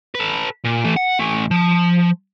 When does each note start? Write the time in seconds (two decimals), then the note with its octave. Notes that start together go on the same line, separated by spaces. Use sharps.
0.15 A4 B4
0.65 A#2
0.85 E3 A3
0.97 F#5
1.19 E3 A3
1.51 F3